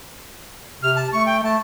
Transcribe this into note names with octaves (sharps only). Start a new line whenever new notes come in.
C3 F6
A5
A3 C#6
G5
A3 A5